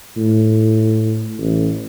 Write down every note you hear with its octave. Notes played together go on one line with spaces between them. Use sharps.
A2
A1